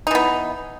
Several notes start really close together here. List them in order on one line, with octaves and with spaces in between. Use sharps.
D#4 E3 B3